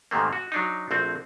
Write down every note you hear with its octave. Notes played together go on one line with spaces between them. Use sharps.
G#2 C3 D#3 A3 A#3
F#4
F#3 D4 D#4
A#1 A3 C4 F#4